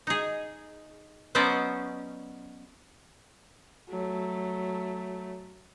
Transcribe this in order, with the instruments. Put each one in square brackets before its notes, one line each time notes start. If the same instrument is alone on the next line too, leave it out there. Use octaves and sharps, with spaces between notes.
[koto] D#4 G#4
F#3 B3 C#4 C5 D5 D#5
[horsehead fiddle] F#3 A3